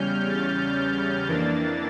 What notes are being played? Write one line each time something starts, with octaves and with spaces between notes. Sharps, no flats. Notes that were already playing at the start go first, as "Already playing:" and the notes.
Already playing: E2 C#3 G3 C#4 F6 G6
A6
F2 E3 A#3 D4 A6